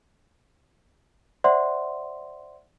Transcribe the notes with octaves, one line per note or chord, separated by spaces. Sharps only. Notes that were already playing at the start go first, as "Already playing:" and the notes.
C5 D5 E5 F#5 C6